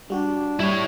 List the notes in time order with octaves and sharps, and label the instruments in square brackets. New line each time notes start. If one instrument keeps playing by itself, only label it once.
[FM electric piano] G3 F#4 G4 [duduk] D4
[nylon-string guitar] G3 [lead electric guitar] E4 C#5